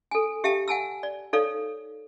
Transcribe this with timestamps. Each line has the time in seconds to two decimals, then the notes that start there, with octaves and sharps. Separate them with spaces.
0.11 A4 G#5
0.44 G4 E5 F5 G5 A5
0.68 F#5 G#5 A5 E6
1.03 D5
1.33 D#4 A4 C#5 D5 F5